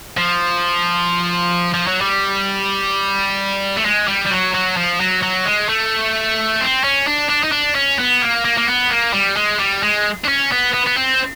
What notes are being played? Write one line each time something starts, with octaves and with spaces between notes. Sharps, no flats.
F3
F3
F#3
G3
A3
G#3
G3
G3
F#3
F#3
F3
F#3
F#3
G#3
A3
C4
C#4
D4
D4
D#4
D4
C#4
B3
A#3
A#3
A#3
B3
A#3
G3
G#3
G3
G#3
D4
C#4
B3
B3
B3
C4